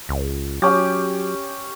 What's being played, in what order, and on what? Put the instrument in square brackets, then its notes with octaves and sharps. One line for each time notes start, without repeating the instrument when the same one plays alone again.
[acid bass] C#2
[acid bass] F#3 [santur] C#4 G4